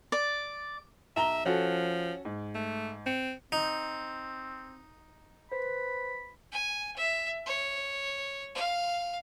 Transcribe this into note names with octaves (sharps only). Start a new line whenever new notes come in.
D5
B1 E5 A#5 G7
F3 C#4 F#4 A4
G#2
A3
C4 C#7
C4 D#4
B4 C5 B5
G#5
E5
C#5
F5